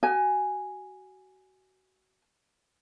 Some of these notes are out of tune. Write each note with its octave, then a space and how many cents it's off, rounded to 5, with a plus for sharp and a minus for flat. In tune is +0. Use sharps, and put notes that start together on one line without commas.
F#4 +25 G#5 +0